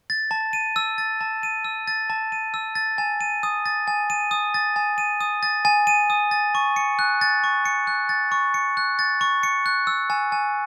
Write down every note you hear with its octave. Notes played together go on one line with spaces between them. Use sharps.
A6
A5
D#7
E6
A6
A5
D#7
E6
A6
A5
D#7
E6
A6
G#5
D#7
D#6
A6
G#5
D#7
D#6
A6
G#5
D#7
D#6
A6
G#5
D#7
D#6
A6
C#6
C#7
F#6
A6
C#6
C#7
F#6
A6
C#6
C#7
F#6
A6
C#6
C#7
F#6
E6
G#5
G#5